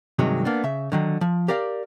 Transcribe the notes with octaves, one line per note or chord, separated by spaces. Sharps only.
G2 C3 D#3 F#3 G#3
A#3 B3 D4
C#3 E5
D3 D#3 F#3
F3
G4 A#4 D5 F5